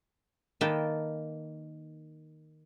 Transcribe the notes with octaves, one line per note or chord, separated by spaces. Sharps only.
D#3 A#3 B4 G5 A5